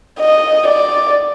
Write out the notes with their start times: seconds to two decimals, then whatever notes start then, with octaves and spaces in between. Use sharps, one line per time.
0.20 D#5
0.68 D5